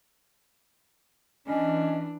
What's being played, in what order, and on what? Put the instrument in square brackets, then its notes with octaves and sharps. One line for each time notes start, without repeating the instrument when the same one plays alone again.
[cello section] E3 [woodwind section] C#4 [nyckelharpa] D4 [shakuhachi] D#5